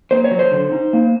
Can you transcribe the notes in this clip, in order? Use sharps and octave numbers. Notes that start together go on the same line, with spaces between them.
A#3 C5
C#5
F#3
C5
D3
D#4
A#3